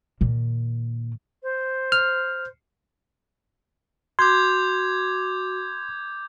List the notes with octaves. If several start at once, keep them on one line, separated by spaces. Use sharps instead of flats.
A#2 D#3
C5
F6
F#4 C6 D6 G6 G#6